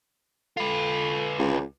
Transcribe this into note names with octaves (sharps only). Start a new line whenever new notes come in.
F4 A4 B4
C#2